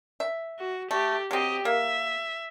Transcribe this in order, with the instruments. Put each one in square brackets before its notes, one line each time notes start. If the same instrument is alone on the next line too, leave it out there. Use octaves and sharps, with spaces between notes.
[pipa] E5
[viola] F#4
[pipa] A3 [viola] G4
[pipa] F#3 C4 [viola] G4 D#5
[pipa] A#3 [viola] E5